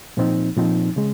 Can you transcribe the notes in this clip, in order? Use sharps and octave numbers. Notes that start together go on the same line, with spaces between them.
A#2 F3 C4 D#4
A#2 F3 C4 D#4
C#3 G#3